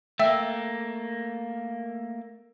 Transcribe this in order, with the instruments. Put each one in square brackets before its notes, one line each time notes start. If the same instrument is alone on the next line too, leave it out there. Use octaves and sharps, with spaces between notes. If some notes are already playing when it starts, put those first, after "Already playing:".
[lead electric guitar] A3 A#3 [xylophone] E5 G5 E6